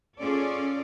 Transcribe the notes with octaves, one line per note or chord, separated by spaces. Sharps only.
C#4 F4 G#4 A4 D5